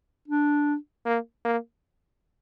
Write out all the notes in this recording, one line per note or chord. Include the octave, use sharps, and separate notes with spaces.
D4
A#3
A#3